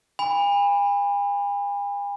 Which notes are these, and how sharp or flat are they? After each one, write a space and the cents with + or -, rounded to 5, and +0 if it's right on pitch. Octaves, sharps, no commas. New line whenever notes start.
G#5 -45 B5 +0